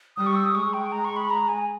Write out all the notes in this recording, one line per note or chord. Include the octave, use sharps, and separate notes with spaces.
G3 D#6
C#6
E6
D#6
G#3 C#6
G5
A#5
C#6
B5
A#5
G#5